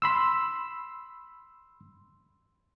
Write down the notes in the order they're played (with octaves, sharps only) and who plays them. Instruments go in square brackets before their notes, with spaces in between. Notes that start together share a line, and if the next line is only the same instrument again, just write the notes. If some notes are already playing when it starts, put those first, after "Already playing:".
[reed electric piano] B5 C6 E6